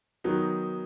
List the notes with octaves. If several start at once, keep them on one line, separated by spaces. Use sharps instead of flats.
D#3 F#3 B3 D#4